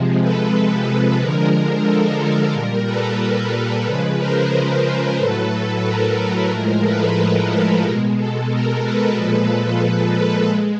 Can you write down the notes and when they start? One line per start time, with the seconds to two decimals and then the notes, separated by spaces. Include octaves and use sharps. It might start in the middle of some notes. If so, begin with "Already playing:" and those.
Already playing: C3 F3 G#3
0.21 A4 B4
1.20 D3 F3 G#3 A#4
1.87 A4
2.20 A#4
2.53 A#2 G3 A#4
2.86 A4 B4
3.19 A4
3.52 A#4
3.85 C#3 F3 G#3 A4 B4
4.18 A#4 C5
5.18 A2 F#3 A4 B4
5.51 A4
5.84 A#4
6.18 A4
6.51 A2 F3 G#3 A#4
6.84 A4 B4
7.17 A4
7.83 B2 G#3 A#4
8.16 A4
8.50 A#4
8.83 A4 B4
9.16 A#2 F3 G#3 A4 B4
10.15 A4 B4
10.49 G#3